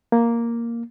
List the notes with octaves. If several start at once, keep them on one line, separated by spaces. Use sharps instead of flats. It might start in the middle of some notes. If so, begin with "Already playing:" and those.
A#3